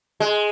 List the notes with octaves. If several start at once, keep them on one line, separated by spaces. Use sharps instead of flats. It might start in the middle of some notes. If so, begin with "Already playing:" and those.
G#3